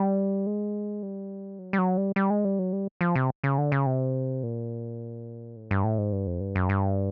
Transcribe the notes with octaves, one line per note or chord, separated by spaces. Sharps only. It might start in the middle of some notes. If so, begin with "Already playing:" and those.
Already playing: G3
G#3
G3
F#3
G3
F#3
G3
G3
G#3
G3
F#3
G3
F3
C3
C#3
D3
C#3
C3
A#2
A2
G2
A2
G#2
G2
F2
G2
F#2
G2